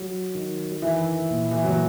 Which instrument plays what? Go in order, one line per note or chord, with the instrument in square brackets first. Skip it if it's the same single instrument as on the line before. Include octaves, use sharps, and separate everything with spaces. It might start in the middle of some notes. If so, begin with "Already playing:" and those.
Already playing: [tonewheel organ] F#3
D#3
[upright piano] E3 [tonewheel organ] E4
[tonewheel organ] A#2
[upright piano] E3
F#3